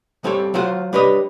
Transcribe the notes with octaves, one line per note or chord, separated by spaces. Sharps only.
G3 C4 A4 C5 C#5
F#3 F4 C5 F#5
G3 D4 B4 C#5 D#5